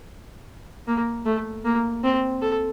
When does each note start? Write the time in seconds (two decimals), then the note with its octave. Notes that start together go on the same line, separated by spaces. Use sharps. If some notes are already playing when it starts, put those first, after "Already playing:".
0.87 A#3
1.26 A3
1.64 A#3
2.04 C4
2.42 A4